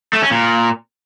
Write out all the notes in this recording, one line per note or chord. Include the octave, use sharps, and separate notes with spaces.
A3
C#4
A#2